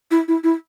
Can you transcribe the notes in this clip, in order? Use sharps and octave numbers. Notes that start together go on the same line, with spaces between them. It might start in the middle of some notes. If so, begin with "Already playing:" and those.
E4
E4
E4